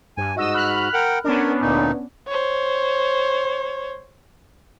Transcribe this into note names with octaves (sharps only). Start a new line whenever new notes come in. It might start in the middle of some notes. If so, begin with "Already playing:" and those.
G2 G#5
G#2 F#4 D#5 E6
B5 F6 F#6
A#4 F#5 G5
B3 C#4 D4 A#4
D2 A#2 D#4
C5 C#5